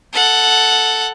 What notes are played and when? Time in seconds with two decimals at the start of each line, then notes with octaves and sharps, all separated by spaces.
0.13 A4 F#5